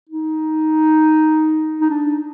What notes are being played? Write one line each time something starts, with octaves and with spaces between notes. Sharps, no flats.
D#4
D#4
D4